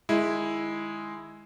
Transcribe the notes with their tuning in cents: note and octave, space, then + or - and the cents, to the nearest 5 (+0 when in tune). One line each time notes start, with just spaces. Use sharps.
D#3 -25 G#3 +0 E4 +0